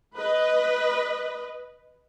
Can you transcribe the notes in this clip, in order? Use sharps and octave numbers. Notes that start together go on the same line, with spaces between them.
B4 D#5